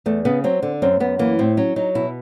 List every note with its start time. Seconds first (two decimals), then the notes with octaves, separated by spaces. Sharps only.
0.06 E2 A3
0.25 C#3 B3
0.44 F#3 C4
0.63 D3
0.82 F#2 C4
1.00 F#2 B3
1.19 E3 A#3
1.39 A2 C4
1.57 F#3 C#4
1.76 F#3 D#4
1.95 B2 E4